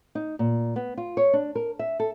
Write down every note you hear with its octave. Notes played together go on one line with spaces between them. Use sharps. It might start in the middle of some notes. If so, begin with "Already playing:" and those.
D#4
A#2
B3
F4
C#5
D4
A#4
E5
A4